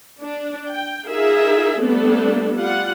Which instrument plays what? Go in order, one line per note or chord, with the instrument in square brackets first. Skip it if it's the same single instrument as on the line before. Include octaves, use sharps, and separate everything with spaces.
[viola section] D4
G5
D#4 F4 G#4 A#4 E5
G3 A3 B3 C4 D4 A4
G3 F4 F#5